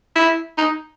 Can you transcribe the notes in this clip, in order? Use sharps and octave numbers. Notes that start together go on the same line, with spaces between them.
E4
D#4